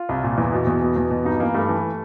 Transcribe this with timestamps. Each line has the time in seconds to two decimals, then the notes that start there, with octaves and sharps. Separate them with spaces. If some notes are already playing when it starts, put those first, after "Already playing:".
Already playing: F4
0.09 C2
0.23 A#2
0.37 E2 E4
0.52 B2
0.67 E2
0.82 B2
0.96 E2
1.10 B2
1.25 G2 D#4
1.40 E3 A#3
1.54 G2 A3
1.69 E3